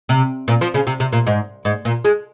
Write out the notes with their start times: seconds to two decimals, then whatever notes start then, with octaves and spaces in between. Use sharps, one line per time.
0.09 C3
0.48 A#2
0.61 F3
0.74 C#3
0.87 C3
1.00 C3
1.13 A#2
1.27 G#2
1.65 G#2
1.85 A#2
2.05 G#3